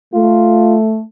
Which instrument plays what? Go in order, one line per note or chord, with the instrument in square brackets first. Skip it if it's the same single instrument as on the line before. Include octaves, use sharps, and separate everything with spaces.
[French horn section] A3 [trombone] F4